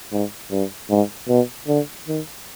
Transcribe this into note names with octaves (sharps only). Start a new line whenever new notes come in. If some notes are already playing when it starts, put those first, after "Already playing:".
G#2
G2
G#2
B2
D3
D#3